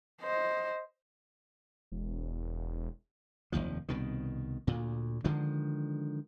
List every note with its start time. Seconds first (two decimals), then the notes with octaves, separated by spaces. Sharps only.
0.21 C5 D#5
1.92 E1
3.52 F1 A#1 D#2 F3
3.89 C2 B2 D#3
4.67 D2 A#2
5.24 D3 D#3 F3 G#3